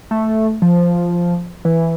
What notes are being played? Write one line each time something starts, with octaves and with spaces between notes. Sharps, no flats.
A3
F3
E3